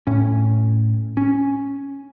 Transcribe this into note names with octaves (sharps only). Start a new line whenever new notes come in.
A2 C#4
C#4